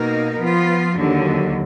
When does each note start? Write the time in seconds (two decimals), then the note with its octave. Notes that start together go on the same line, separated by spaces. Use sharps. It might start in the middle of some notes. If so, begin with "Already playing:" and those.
Already playing: B2 A#3 D#4 A#4
0.38 F3 B3 F4
0.95 D#2 D3 F#3